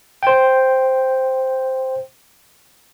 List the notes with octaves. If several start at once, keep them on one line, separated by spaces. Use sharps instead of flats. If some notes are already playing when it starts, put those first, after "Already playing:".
C5 G5